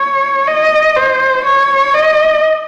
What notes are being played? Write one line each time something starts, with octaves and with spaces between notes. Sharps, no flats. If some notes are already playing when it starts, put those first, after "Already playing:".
Already playing: C#5
D#5
C5
C#5
D#5